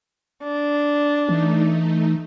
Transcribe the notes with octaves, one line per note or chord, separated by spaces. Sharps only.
D4
E3 A3 D#4